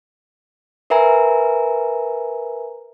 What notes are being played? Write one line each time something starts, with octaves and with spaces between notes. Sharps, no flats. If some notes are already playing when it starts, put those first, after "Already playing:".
A#4 B4 E5 G#5 A#5